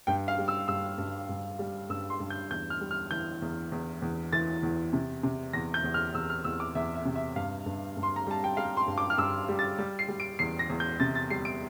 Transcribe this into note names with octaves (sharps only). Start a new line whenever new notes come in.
G2 G5
F5
G3
E6
G2 E6
G2
G2
G3
G2 E6
C6
G2
G6
E2 G6
F6
G3
F6
E3 G6
E2
E2
E2
E3 A6
E2
C3
C3
E2 A#6
G6
E2
F6
E2 E6
F6
E2 E6
D6
E2 E5
E5
C3
E5
G2 F5
G2
G2
C6
A#5
G3 A5
G5
G3 F5
C6
G2
D6
F6
G2 E6
G3
A6
G3
C7
G3
D7
E2 C7
A#6
E2
G6
C3 A6
A6
G3 C7
D7